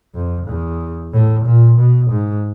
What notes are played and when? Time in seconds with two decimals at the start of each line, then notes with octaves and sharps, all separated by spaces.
0.15 F2
0.48 E2
1.13 A2
1.46 A#2
1.79 B2
2.11 G#2